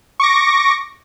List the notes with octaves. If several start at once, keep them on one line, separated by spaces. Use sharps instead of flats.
C#6 D6 A#6